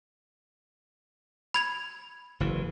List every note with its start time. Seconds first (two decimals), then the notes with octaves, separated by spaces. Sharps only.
1.54 B5 G#6 F7
2.40 F#1 E3